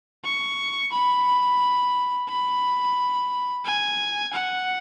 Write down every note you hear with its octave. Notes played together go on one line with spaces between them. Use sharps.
C#6
B5
B5
G#5
F#5